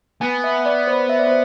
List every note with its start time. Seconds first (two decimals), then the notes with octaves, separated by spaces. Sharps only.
0.21 B3 G#5
0.44 E5
0.66 D5
0.87 C5
1.09 E5
1.19 D5
1.27 C5